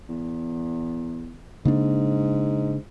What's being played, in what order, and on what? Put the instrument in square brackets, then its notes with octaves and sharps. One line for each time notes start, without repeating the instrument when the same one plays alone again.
[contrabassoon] E2
[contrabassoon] G#2 [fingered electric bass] C#3 A#3 D4